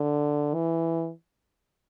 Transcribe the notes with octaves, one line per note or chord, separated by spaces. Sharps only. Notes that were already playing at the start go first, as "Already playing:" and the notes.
Already playing: D3
E3